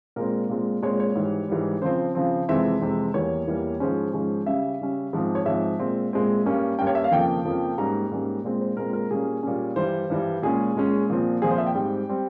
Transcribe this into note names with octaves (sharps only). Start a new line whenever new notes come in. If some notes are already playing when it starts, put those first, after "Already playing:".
A#2 G#3 C4 A#4
A#2 G#3 C4
A#2 G#3 C4 C#5
C#5
G#2 E3 G3
G#2 E3 G3
C#3 F3 C4 C5
C#3 F3 C4
F2 C3 E3 G#3 C4 E5
F2 C3 E3 G#3 C4
E2 E3 G3 A#3 C#5
E2 E3 G3 A#3
G#2 F3 G#3 C#4 C5
G#2 F3 G#3 C#4
C#3 G3 C#4 E5
C#3 G3 C#4
G#2 F3 C4
C#5
G#2 F3 C4 E5
A#2 G#3 C4
A#2 G#3 C4
G2 G3 A#3 C#4
G2 G3 A#3 C#4 G5
C#5
E5
F5
F2 C#3 F3 A#3 G5
F2 C#3 F3 A#3
G#2 G3 A#3 C#4 A#5
G#2 G3 A#3 C#4
A#2 G#3 C4
C5
A#2 G#3 C4 A#4
A#4
A#2 G3 A#3 C#4 G#4
A#2 G3 A#3 C#4
G2 E3 G3 C5
G2 E3 G3
A#2 G#3 C#4 G#4
A#2 G#3 C#4
A#2 F3 C4
A#2 F3 C4 G#4
C5
E5
G5
G#2 G3 C4
G3 C4